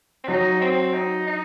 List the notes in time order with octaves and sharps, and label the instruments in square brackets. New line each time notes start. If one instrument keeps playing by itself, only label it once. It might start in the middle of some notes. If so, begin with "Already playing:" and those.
[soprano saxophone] C4
[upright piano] F#3 [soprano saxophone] D#4
[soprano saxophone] C4
D#4
D#4